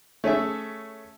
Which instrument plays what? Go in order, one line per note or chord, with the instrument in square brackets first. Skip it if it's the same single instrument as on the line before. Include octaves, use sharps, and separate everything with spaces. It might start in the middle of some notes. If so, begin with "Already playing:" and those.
[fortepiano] A3 C#4 G#4 E5